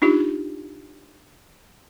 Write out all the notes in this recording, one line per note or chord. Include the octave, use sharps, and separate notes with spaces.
D4 D#4 F4 G4